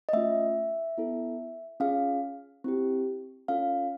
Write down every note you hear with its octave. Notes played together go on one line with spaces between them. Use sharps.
D#5
A3 C#4 F4 E5
B3 E4 A4
C#4 F4 G#4 F5
C4 E4 G4
C#4 F4 A4 F5